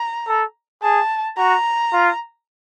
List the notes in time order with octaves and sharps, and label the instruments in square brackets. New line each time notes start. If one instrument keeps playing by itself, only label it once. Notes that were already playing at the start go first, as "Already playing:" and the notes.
Already playing: [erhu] A#5
[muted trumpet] A4
[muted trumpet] G#4 [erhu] A5
[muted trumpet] F#4 [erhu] A#5
[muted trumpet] F4